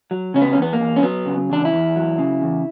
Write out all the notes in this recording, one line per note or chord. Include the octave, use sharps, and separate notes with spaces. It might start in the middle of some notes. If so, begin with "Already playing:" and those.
F#3
C#3 C#4
B3
C#4
E2
B3
A#3
E2
C#4
F#3 B3
C#3
E2 D4
E4
E2
F#3
C#3
E2